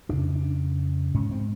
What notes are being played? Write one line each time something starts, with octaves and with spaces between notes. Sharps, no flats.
F2 C#3 D4
D4
G#2 C#4
C4